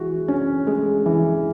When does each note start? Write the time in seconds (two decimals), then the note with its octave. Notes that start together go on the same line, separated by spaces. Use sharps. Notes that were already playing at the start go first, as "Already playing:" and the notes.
Already playing: E3 G#3 F#4
0.28 C#4
0.67 G#3
1.06 E3